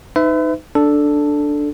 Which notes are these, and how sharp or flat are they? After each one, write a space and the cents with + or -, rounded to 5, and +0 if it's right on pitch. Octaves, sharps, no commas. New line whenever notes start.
D#4 +0 B4 +40 E5 +0
D4 +0 A4 +0